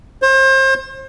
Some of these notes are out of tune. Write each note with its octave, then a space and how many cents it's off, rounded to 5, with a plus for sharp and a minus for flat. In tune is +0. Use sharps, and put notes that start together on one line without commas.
C5 +35